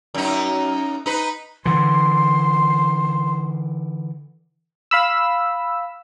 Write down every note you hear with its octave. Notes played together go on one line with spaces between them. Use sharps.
F#2 D#4
D#4 B4
D3 E3 C6
F5 B5 E6